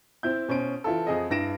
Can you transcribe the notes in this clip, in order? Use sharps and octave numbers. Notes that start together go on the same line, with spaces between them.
C4 E4 G6
B2 C#4 C5 D7
E3 E4 F4 A4
F2 G#4 D#5
G2 E4 A#6 D7 E7